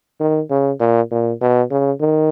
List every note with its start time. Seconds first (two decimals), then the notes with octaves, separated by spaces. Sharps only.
0.20 D#3
0.50 C#3
0.80 A#2
1.11 A#2
1.41 B2
1.71 C#3
2.00 D#3